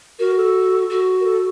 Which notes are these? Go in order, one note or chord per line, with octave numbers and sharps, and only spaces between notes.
F#4 A#4
A4
F#4
A#4
A4